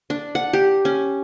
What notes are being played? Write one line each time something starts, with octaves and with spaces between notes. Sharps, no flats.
D4
F#5
G4
C#4